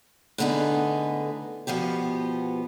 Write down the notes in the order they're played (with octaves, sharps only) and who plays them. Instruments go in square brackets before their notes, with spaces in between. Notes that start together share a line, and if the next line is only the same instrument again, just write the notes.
[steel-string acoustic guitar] A2 D3 B3 D#4 G#4
B2 F3 B3 G4